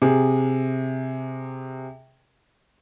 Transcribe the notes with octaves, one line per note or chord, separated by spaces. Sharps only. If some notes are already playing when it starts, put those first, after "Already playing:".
C3 G#4